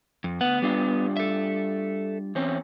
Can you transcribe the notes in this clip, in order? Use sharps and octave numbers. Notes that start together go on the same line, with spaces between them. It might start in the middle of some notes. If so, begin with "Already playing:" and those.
F2
D2 B3 F#5
G3 D4 F4
A4 E5
E2 C4 C#4